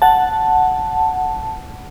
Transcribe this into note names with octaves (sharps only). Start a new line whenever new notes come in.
F#5 A5